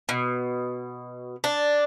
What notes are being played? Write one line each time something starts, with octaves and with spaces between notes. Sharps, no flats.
B2
D4